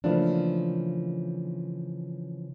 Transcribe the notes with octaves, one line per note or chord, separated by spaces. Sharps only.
C#3 E3 F3 A3 A#3 D4